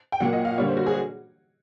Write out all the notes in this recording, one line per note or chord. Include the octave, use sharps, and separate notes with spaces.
G5
A#2 F#3 A#3 F#5
D#5
F5
D3 G3 A#3 C#5
C5
F#4
G#4